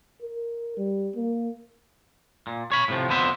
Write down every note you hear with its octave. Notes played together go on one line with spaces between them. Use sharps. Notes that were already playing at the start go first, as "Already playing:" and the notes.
A#4
G3
A#3
A#2
C#5 B5
A2 C3 F3
F2 D3 B3 C5 E5